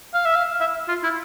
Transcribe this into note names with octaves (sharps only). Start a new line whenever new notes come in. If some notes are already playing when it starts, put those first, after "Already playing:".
F5
E5
F5
E5
F4
E4